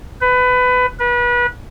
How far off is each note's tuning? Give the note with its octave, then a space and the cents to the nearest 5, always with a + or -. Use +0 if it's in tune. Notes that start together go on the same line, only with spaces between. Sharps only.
B4 +20
B4 -30